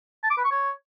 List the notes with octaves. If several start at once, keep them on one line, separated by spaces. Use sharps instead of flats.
A5
D6
B4
C#6
C#5